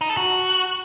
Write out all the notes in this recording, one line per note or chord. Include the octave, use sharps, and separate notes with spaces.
D#4
A4
F#4